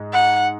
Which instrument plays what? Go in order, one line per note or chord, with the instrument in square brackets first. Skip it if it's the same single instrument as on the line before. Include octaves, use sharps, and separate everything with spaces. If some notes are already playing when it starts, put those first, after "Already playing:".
Already playing: [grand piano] G#2 G#3
[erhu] F#5